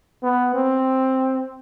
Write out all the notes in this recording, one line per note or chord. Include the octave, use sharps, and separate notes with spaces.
B3
C4